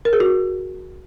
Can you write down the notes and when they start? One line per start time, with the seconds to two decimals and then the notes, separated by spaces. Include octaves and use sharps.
0.05 A#4
0.13 G#4
0.20 F#4